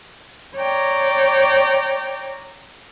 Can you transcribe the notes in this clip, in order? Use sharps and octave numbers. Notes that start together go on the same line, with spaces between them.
C#5 D5 G5 A#5